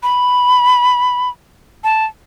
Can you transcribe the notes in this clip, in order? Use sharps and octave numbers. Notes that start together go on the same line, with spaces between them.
B5
A5